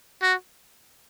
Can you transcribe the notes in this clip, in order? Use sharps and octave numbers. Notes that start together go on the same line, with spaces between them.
F#4